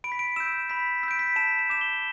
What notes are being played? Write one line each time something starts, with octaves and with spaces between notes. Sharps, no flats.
B5 D7
B6
D7
E6 G6 E7
B5 B6
E6 B6
G6 D7
B6
A5 E7
E7
D6 G6 E7
G7